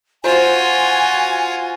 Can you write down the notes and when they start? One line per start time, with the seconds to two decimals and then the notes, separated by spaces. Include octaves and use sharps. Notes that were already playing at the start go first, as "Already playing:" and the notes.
0.24 F4 F#4 C5 G#5